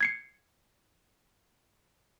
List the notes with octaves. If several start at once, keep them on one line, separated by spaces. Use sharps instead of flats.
G#6 C7 C#7